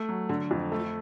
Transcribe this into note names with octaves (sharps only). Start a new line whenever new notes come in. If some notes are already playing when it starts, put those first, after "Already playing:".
Already playing: A3
F#3
D3
F2
A3